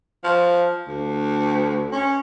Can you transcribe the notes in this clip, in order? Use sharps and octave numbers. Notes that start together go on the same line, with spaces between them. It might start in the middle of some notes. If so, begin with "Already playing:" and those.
F3
D2
C#4